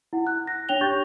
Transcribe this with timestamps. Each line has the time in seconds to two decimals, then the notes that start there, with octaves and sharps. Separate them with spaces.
0.13 E4 F#5
0.27 F#6
0.47 A#6
0.69 D4 C#5 G5 F7 G7
0.81 G4 C#6 G6 A6